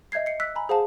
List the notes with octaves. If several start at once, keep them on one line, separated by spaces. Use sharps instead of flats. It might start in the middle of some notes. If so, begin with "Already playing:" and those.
D#5 E5 G6 G#6 C7
C7 C#7
E6 F#6 B6
G#5 A#5 B5
G#4 C5 F5 F#5 A5